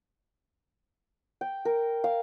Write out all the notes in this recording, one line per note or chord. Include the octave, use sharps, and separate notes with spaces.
G5
A#4
F5